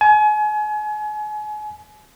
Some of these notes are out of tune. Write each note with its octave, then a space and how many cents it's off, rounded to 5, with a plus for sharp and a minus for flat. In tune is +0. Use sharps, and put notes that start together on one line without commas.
G#5 +35